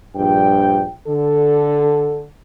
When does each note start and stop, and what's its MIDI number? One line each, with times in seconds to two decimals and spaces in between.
0.16 0.88 34
0.16 0.83 43
0.16 0.88 79
1.07 2.31 50
1.07 2.23 69